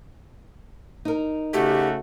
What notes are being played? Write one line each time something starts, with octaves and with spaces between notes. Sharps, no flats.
D#4 A#4
C#3 A3 F#4 G4